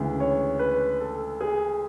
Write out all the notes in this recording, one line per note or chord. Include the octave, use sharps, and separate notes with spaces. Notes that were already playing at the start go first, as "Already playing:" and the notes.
Already playing: D2 C#3 E3 G#3
C#5
B4
A4
G#4